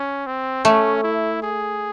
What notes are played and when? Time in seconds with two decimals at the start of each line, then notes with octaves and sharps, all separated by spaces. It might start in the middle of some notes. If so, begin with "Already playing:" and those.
Already playing: C#4
0.27 C4
0.65 A3 C#4
1.04 E4
1.43 G#4